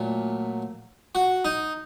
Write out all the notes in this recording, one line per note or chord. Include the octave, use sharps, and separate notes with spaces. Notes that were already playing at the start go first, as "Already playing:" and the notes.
Already playing: A#2 F#3 A3
F#4
D#4